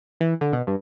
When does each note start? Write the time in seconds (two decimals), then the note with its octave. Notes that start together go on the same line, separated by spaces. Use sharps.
0.21 E3
0.41 D3
0.53 B2
0.67 G2